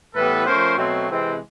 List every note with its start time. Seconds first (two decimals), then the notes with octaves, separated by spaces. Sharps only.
0.15 A2 E3 G3 B3 A4 B4
0.45 F3 A3 C#4 A#4 C5
0.77 B2 F#3 A3 C4
1.08 C3 E3 G#3 C4